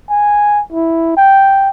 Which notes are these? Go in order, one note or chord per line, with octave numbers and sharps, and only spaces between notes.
G#5
E4
G5